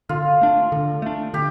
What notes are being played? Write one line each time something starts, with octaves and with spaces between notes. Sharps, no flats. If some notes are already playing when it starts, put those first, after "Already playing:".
D3 F4
A3 D4
D3
A3 D4
D3 G4